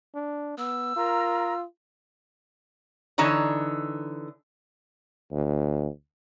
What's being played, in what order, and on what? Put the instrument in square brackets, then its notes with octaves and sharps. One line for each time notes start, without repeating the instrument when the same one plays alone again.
[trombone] D4
[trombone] B3 [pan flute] E6
[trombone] F4 [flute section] A#4 A#5
[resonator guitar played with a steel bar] D3 E3 D#4 C#5 A#5
[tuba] D2